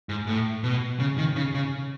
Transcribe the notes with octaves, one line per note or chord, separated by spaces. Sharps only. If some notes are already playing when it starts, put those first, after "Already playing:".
G#2
A2
B2
C#3
D#3
C#3
C#3